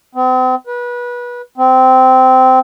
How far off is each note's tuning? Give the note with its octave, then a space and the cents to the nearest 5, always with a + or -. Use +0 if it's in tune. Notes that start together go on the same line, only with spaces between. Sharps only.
C4 -40
B4 -25
C4 -15